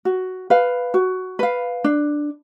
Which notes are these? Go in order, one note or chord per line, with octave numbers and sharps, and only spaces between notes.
F#4
B4 F5
F#4
B4 F5
D4